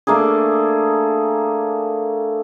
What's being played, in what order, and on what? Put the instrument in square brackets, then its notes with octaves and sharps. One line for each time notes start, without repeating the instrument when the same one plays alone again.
[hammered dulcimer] A3 A#3 D4 G#4